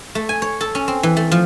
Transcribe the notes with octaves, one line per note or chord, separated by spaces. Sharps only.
A3
G#5
C#5
A4
C#4
C4
E3
A3
F3